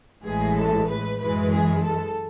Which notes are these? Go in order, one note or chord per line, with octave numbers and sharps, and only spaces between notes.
A1 A2 E3 G#3 G#4
A4
B4
F#2 E3 G#3 B4
G#4
A4